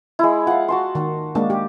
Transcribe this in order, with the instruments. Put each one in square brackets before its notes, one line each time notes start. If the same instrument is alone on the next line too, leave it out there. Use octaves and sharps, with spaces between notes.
[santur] G#3 E4
[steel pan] F4 [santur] F5 F#5
[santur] F#4 A5 C6
[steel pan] D#3
[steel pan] G#3 A#3 D4 [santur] A5
[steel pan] G4